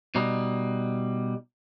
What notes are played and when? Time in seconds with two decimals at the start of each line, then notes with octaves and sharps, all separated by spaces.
0.15 B2 G3 D#4